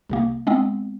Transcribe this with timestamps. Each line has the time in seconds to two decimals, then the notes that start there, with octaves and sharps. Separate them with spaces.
0.10 C2 C3 A#3
0.47 G#3 B3 C4